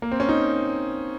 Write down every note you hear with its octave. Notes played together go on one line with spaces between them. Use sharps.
A#3
C4
C#4
D#4